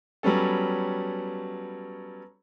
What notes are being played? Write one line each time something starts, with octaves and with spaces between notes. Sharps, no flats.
F#3 G3 B3 C#4 A4